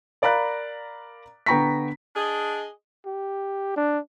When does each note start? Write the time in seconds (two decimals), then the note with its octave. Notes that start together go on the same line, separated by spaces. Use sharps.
0.22 A#4 D5 F5 A#5 B5 F#6
1.46 D3 B3 G5 A#5 C#6 B6
2.16 D4 G#4 D#5
3.06 G4
3.77 D4